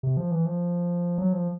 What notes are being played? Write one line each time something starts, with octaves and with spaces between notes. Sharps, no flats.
C3
F3
E3
F3
F#3
F3